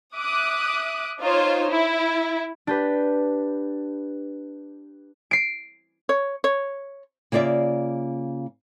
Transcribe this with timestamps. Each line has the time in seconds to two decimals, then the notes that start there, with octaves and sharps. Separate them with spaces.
0.16 E5 D6 D#6 F#6
1.20 D#4 F4 C5 C#5
1.69 E4
2.67 D4 G4 B4
5.31 C7 D7
6.09 C#5
6.44 C#5
7.32 C#3 A#3 F4 D5 E5